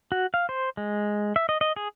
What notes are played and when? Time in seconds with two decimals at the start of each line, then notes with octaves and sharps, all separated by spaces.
0.12 F#4
0.34 F5
0.49 C5
0.77 G#3
1.36 E5
1.49 D#5
1.61 D#5
1.76 G#4